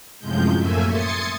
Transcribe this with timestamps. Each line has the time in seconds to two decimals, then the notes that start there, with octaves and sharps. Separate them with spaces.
0.19 F#2 A2 C3 F3 G#3 G6
0.58 F#2 A3 A#3 E5 G#5
0.87 C6 D#6 G#6 A6 C7 C#7